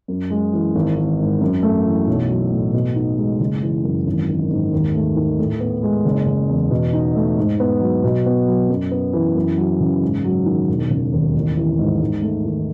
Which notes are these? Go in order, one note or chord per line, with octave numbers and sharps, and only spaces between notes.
F#2
G#3
E3
G#1
D#3
G#2
F#2
A3
E3
B1
F#3
A2
B2
D#4
G#3
F#1
E3
F#2
G#1
D#3
G#2
D#2
A3
D#3
A2
B3
G#3
F#1
C#3
E2
B2
D#4
A3
G#2
B3
F#3
B2
B3
F#3
F#2
B3
E3
F#2
F#3
C#3
G#2
F#3
D#3
E1
C#3
D#2
A1
E3
G#2
G#2
A3
D#3